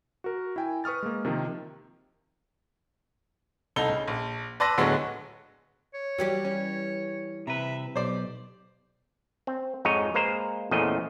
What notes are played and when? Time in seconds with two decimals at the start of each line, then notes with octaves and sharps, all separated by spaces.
0.24 F#4 A#4
0.56 E4 G5 G#5
0.84 B4 C#6 D#6 F6 A6
1.03 G#3 A#3
1.25 C3 D#3 F3
3.76 C2 D#4 A4 G7
3.89 C#3
4.08 A#1
4.60 B4 D5 A5 C6 E6 A#6
4.78 D2 A2 D3 F#3 G#3 B3
5.94 C#5
6.18 E3 F#3 G3 G4
6.44 C#4
7.47 C3 B4 E5 A#5
7.96 B1 G4 C5 D5
9.47 C4
9.85 F2 G#2 D#4 C#5 D#5
10.14 G#3 A#3 B4 C5 A#5
10.71 E2 A#2 C#3 F3 A3 D#5